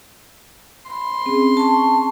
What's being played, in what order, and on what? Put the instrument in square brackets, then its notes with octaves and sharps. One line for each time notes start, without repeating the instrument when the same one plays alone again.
[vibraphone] B5 [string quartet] C6
[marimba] C4 C#4 G#4
[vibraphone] A5 C#6